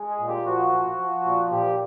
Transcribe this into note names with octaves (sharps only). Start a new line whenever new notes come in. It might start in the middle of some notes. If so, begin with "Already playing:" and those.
Already playing: G#3
G#4
A#2
G4
F3 F#4
F3
F3
A#2
A#2 G4